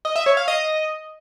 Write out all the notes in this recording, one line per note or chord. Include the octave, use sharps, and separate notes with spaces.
D#5
E5
C#5
F5
D#5